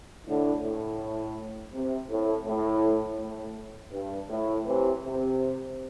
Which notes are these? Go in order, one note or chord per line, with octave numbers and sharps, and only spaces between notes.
A2 D3
A2
C3
A2
A2
A2
G2
A2
C3 E3
C3